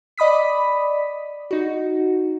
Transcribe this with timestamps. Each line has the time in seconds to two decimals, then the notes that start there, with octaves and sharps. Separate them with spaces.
0.18 D5 D#5 B5 D#6 B6
1.51 D#4 F#4